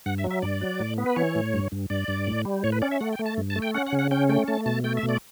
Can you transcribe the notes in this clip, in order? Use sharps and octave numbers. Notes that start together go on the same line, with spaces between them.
G2 F#5
E5
F#3
E5
G2 D5
F#3
A2
B3
B4
E3 C#5
A2
G2
G2
G2 D5
G2
A2
G3
A2 C#5
B4
C#4 D5
E5
A3 F#5
G5
A3
A5
G2
A5
A3
G5
C#4 F#5
F#5
C#3
F#5
C#4 G5
A3 G5
A3 A5
B2 A5
A3 G5
E5
B2
D5